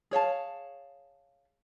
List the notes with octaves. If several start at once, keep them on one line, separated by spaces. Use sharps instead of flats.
G#4 C#5 F5 A5